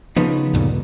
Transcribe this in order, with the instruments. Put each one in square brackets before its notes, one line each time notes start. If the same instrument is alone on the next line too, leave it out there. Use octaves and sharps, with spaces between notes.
[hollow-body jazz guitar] C#3 B3 D#4 [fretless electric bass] F3
[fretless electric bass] D2 G2 A#2